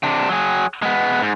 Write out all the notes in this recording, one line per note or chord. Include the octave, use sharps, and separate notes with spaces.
C3 D4
F#3 G#4
G#3 B3
G#2